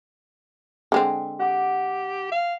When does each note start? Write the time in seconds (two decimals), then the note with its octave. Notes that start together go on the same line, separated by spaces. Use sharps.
0.92 D3 G#3 C4
1.39 G4 F#5 D6
2.32 F5